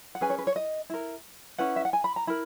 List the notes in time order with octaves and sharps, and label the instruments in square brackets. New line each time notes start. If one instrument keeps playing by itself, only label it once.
[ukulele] F#5
C#4 G#4 B4 G#5
C#5
B4
C#5
D#5
E4 A#4
C#4 E4 B4 F#5
E5
F#5
G#5
B5
A#5
E4 A#4 B5